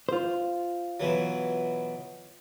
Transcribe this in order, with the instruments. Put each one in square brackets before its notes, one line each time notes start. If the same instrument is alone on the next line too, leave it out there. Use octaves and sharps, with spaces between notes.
[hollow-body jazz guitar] F4 C5
[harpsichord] B2 E3 F#3